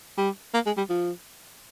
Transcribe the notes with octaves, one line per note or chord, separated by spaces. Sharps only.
G3
A#3
G#3
G3
F3